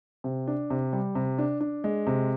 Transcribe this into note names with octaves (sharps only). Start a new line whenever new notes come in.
C3
D4
C3
G3
C3
D4
D4
G#3
C3